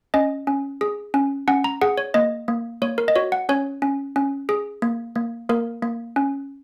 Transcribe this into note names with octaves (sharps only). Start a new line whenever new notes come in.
C#4 D#5
C#4
G#4
C#4
C#4 F#5
A#5
G#4 F#5
C#5
A#3 D#5
A#3
A#3 C#5
A#4
D#5
F#4 C#5
F#5
C#4 C#5
C#4
C#4
G#4
A#3
A#3
A#3 A#4
A#3
C#4